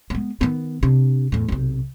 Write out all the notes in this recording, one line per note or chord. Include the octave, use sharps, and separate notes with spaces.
G#3 B3
D#3 B3
C3 D4
E2 A2
B1 C3